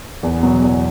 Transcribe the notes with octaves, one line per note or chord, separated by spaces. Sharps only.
E2
B2 F#3
E2